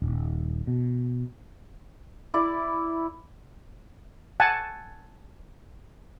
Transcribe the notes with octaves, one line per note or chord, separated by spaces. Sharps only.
D#1
B2
E4 D5
F#5 G#5 A5